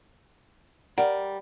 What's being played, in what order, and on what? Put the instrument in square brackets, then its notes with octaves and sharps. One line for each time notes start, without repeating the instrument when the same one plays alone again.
[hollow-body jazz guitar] G3 A#4 [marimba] D5 [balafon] F#5